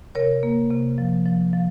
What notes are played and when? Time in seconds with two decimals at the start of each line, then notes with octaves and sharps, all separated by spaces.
0.15 C3 A#4 C#5
0.43 A#3
0.70 C3
0.98 F3
1.26 F3
1.53 F3